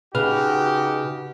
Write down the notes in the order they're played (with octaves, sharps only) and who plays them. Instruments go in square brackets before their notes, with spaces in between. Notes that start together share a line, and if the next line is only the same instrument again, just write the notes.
[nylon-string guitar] C#3 [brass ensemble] D#4 F#4 G4 [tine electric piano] B4 F6